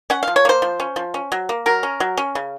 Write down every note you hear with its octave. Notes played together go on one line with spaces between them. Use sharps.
C#4 F#5
F3 F5
C#5
A#3 C5
F3
C#4
F3
C#4
F#3
A#3
F#3 A#4
C#4
F#3
C#4
C#3